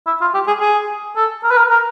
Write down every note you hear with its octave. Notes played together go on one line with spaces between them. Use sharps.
E4
F4
G4
G#4
G#4
A4
A#4
B4
A#4
A#4